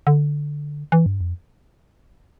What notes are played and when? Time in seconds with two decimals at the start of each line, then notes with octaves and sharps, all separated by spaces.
0.07 D3
0.92 E3
1.06 G2
1.21 F2